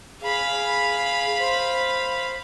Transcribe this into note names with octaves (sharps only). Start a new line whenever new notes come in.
G#4 F5 B5
C5